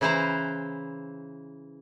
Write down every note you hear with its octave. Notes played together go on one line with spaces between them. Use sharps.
C#3 E3 E4 B4 C5 A#5